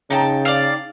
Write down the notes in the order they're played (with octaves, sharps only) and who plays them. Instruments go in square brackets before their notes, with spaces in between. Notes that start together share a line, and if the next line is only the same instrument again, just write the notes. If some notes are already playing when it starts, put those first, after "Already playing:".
[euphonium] C#3 [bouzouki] D#4 G5 A5
[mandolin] D5 F5